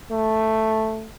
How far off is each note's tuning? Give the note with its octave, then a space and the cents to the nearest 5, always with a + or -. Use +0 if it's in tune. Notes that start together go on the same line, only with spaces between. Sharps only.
A3 +0